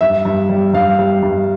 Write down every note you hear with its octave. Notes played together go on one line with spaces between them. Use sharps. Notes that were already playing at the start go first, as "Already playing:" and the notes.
G2 E5
G2
G3
G2 F5
G3
G2